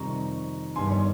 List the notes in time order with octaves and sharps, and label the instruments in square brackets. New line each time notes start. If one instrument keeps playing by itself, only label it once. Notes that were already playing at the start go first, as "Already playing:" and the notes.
Already playing: [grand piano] F2 C3 D#3 G3 A#5 C#6
G1 G2 D#3 G3 G#5 C6
C#5